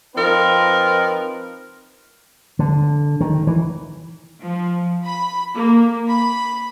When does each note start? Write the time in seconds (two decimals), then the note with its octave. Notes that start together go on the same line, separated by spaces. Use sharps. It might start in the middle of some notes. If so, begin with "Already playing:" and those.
0.16 F3 C4 D#4 A#4 B4
2.59 D3
3.21 D#3
3.47 E3
4.42 F3
5.06 B5
5.55 A#3
6.09 B5